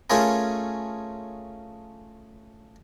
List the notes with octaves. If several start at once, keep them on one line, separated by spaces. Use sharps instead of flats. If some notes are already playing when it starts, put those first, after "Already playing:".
A3 C#4 F4 G#4 A#4